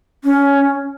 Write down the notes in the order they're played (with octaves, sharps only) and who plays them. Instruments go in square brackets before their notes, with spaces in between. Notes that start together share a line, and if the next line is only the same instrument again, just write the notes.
[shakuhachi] C#4